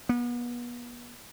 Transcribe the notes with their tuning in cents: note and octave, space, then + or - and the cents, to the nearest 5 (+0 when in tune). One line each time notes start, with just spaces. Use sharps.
B3 -35